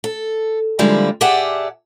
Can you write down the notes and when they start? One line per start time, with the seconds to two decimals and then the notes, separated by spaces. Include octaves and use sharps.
0.04 A4
0.79 D3 F3 G3 G#3 A#3 E4
1.21 G4 G#4 D5 E5 F#5 A5